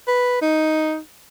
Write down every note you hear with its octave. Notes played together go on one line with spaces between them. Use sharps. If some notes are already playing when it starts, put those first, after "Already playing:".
B4
D#4